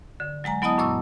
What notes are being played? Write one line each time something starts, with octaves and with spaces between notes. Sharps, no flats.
D3
F#3 G#3 G#5 A#5
F#3 B3 E4 D#5 A5 D#6
F#2 A#2 C#6 E6